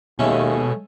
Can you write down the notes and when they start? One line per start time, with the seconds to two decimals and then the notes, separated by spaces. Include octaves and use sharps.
0.19 D#2 B2 G#3 A3 C#4